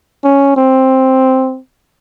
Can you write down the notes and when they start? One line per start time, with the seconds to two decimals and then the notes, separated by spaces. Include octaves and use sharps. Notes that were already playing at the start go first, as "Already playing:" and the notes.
0.24 C#4
0.57 C4